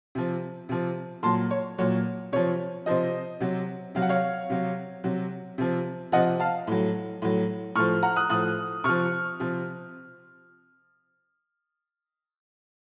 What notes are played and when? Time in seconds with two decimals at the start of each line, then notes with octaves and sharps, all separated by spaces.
0.15 C3 F3
0.69 C3 F3
1.23 A#2 F#3 A5 C6
1.51 C#5
1.79 A#2 F#3 C#5
2.32 C3 F3 C#5
2.86 C3 F3 C5 D#5
3.40 C3 F#3
3.95 C3 F#3 F5
4.02 F#5
4.09 C#5 F5
4.50 C3 F#3
5.04 C3 F#3
5.58 C3 F3
6.12 C3 F3 D#5 F#5
6.40 F5 A5
6.67 A2 F#3
7.22 A2 F#3
7.75 A2 C#6 F6
7.79 F3
8.03 F#5 A#5
8.16 D#6 F#6
8.30 A2 F3 D#6 F#6
8.84 C3 F3 C#6 F6
9.40 C3 F3